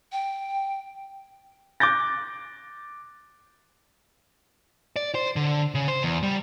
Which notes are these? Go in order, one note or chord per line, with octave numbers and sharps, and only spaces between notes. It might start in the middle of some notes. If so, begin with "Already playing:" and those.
G5
D6 F#6 G6 A6 A#6
D5
C5
D3
C#3
C5
E2
G3